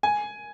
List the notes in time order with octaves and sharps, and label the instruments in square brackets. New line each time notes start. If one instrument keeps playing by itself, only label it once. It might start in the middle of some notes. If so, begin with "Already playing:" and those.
[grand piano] G#5